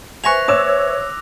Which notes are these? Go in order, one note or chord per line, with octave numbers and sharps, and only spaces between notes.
B4 C5 E5 G#5 C#6 F#6 A#6 F7
C#5 D6 E6 E7